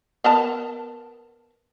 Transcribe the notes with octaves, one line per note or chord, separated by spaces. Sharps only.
B3 A#4 A5